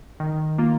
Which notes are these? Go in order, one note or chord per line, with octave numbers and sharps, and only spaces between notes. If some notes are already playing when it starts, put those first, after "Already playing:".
D#3
A#3 F4